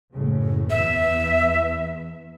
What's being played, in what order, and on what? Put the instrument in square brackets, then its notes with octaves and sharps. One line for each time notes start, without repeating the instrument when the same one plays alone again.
[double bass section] F#1 A2 C#3
[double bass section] E2 B3 [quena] E5